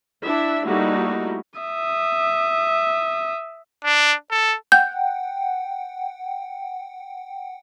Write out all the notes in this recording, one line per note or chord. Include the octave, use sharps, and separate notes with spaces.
D4 E4 E5
G3 A3 A#3 D#4 E4 F#4
E5 D#6
D4
A4
F#5 G5 G6